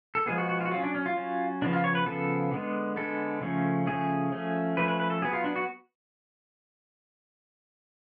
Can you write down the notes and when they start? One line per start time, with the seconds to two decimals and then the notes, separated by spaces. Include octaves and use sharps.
0.15 A4
0.26 F3 G#3 B3 G#4
0.38 F#4
0.49 F#4
0.61 F4
0.65 F#4
0.71 F#3 C#4 F4
0.83 D4
0.95 C#4
1.06 F4
1.16 F#3 C#4
1.62 C#3 F3 B3 D4
1.73 F4
1.84 C#5
1.95 B4
2.06 C#3 F3 B3 A4
2.51 D3 G#3 B3
2.96 D3 G#3 B3 A4
3.41 C#3 F3 A3 C#4
3.86 C#3 F3 A3 C#4 G#4
4.32 F3 A3 C#4
4.77 F3 A3 C#4 B4
4.88 B4
5.00 B4
5.10 A4
5.22 F#3 B3 G#4
5.33 F4
5.44 D4
5.56 F#4